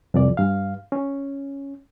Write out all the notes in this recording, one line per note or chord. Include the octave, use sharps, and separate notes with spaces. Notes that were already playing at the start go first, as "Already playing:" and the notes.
C2 F2 D5
G2 F5
C#4